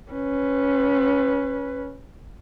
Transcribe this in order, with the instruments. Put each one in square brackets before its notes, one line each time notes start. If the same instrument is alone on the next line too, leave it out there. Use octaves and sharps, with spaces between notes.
[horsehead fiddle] C#4 B4